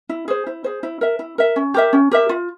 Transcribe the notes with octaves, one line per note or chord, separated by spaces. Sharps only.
E4
G#4 C5
E4
G#4 C5
E4
A#4 E5
E4
A#4 E5
C#4
G4 A#4 E5
C#4
G4 A#4 E5
F4